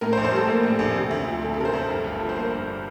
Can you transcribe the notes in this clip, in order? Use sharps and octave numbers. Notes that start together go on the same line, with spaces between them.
A2 A#4
C5
A#1
C5
G3 A4
A#3
A2
A#1
C3
D2
F3
A3 A4
A4
C3 A#4
C5
D2 A4
G2
G1
F3
C5
A#3 A#4
G2